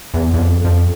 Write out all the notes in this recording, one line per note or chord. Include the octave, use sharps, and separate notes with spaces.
E2
E2
F2
F2